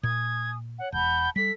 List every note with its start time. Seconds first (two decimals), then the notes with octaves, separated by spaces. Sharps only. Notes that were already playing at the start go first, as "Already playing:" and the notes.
0.03 A#2 G#5 D#6 G#6
0.78 C#5 F#5
0.92 E1 F#5 A5 B5 G6
1.36 G3 A4 B6